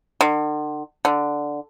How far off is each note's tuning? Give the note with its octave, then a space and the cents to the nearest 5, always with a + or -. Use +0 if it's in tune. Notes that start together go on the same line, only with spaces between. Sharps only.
D3 +40
D3 +0